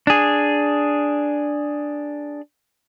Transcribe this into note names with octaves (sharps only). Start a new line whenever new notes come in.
D4 G#4